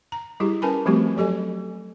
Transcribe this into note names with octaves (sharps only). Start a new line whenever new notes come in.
A#5
G3 E4 G4 G#4
C#4 A#4 B4 G#5 A5 B5
F3 G3 A3 C4 F#4 G4
F#3 G4 A4 D#5 G#5